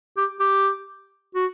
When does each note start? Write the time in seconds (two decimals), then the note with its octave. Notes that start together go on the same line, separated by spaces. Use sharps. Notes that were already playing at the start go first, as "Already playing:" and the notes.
0.17 G4
0.40 G4
1.35 F#4